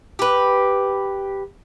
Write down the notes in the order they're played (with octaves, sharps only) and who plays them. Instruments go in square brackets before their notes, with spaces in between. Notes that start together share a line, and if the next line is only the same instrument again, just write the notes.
[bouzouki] G4 B4